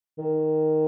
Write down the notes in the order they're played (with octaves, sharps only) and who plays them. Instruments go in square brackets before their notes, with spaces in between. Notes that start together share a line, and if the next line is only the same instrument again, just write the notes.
[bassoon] D#3